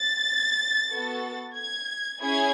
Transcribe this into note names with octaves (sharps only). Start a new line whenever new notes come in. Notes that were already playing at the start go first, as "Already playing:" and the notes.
Already playing: A6
B3 F#4 A4
G#6
C#4 E4 G#4 G#6